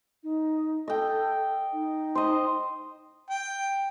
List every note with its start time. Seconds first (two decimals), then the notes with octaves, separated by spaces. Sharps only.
0.23 D#4
0.88 A4 D#5 G5
1.73 D#4
2.15 C5 D#5
3.30 G5